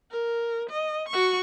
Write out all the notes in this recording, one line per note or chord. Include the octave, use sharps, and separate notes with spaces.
A#4
D#5
F#4 C#6